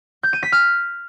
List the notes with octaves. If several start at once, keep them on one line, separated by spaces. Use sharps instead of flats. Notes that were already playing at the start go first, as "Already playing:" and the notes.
G6
D#7
B6
F6